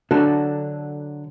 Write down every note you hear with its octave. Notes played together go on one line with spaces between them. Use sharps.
D3 F#3 D4 F#4 A4